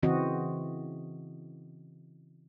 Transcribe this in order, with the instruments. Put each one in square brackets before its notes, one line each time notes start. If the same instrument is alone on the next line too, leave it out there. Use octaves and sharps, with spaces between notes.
[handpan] C#3 E3 C4 F#4 D#5